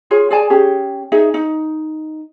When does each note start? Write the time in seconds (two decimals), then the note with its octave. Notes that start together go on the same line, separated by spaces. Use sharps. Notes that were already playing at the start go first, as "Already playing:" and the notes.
0.11 F4 G#4 C#5
0.31 G#4 D5 G#5 A5
0.50 C#4 G4 G#4
1.12 D#4 G#4 E5
1.34 D#4